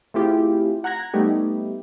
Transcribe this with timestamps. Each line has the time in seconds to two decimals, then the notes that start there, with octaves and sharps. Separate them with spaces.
0.14 A3 C4 E4 F4 G4 G#4
0.84 F#5 A#5 F#6 G#6 A#6
1.14 G3 A3 B3 D#4 G4